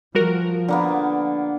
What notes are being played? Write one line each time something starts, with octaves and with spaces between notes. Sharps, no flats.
F3 G3 F#4 A#4
D3 A#3 B3